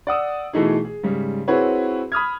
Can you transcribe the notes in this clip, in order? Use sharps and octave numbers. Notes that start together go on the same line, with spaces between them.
D5 F#5 D#6 E6
B2 E3 A3 D#4 E4 G#4
G#4
G#2 C#3 G3
C4 E4 F#4 G#4 B4 C#5
B5 D#6 F6 G#6